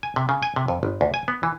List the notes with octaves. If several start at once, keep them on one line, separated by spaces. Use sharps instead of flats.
G#5
C3
C#3
G#5
C3
F2
G1
D2
G#5
B3
E3